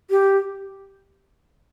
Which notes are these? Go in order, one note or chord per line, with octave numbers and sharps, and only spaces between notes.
G4